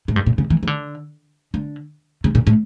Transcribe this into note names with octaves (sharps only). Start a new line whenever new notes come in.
A2
G2
A#2
C#3
E3
E3
D3
D3
C#3
A#2
A2